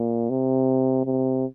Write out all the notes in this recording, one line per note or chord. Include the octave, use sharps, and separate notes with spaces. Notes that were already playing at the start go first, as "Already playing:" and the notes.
Already playing: A#2
C3
C3